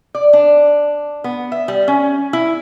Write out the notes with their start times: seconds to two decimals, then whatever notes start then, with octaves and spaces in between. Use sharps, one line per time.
0.15 D5
0.33 D4
1.24 B3
1.52 E5
1.68 G3
1.88 C#4
2.33 E4